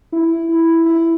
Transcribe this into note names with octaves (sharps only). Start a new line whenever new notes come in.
E4
E4
E4